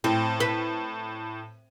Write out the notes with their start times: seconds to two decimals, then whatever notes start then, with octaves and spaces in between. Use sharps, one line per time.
0.04 A2 C4
0.40 B4